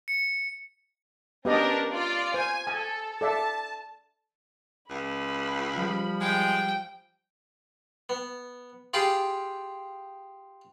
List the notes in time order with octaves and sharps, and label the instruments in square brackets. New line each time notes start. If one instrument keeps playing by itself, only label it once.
[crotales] C#7
[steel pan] B3 G4 D#5 [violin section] C#4 D4 A#4
[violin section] F4 D5
[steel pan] C5 [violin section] G#5
[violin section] A4 [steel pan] G#5
[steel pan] A4 D5 E5 [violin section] A5
[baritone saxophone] C#2 [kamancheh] B5
[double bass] F3 G3
[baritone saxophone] G#3 [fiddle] G5
[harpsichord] B3
F4 G4 G#4 B5 C6 D6